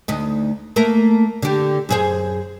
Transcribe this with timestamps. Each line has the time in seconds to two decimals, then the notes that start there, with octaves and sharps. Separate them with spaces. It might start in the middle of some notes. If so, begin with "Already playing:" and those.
0.08 D2 D#4
0.76 A3 A#3 A#4
1.42 D3 G4
1.89 F#2 G#4 C5